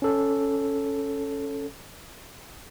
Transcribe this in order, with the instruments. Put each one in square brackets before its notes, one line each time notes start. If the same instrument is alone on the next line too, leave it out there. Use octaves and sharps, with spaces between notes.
[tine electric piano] C#4 A4